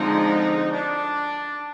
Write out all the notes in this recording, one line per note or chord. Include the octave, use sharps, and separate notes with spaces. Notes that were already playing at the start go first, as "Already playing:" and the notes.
Already playing: D3 F3 G#3 C4 D#4
D4